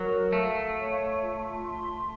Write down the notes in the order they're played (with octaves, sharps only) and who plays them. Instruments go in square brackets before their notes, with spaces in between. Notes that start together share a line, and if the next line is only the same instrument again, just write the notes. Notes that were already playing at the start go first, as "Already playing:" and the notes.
Already playing: [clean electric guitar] F#3 [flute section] A#4
[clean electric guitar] A3 [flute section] F5
[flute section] C#5
F4
C6